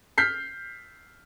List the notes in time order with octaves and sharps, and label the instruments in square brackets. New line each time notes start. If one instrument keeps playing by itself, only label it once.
[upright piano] F6 G6 B6 C7